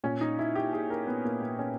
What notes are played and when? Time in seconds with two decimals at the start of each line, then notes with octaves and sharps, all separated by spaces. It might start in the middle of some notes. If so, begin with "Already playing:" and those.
0.04 A#2 C#4
0.21 D#4
0.39 E4
0.55 G4
0.73 G#4
0.90 A#4
1.07 B3
1.25 A#3
1.41 B3
1.59 C#4